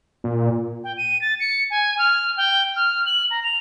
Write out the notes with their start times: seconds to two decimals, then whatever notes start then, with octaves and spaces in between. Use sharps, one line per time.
0.24 A#2
0.84 G5
0.97 D#7
1.22 A6
1.40 C#7
1.70 G#5
1.99 F6
2.37 G5
2.76 F6
3.06 F#7
3.31 A#5
3.44 F7